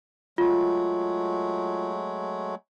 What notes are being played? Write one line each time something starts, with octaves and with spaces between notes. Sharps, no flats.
F#3 G#3 A3 F4